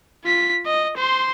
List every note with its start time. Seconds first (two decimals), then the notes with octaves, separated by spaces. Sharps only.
0.24 F4 B6
0.66 D#5
0.97 C5 C6